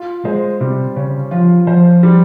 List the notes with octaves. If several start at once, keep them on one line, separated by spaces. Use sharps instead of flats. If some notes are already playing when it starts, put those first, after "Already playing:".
Already playing: F4
G#3 C5
C3 G3
C#3 C#4
F3 F4
F3 C5
G3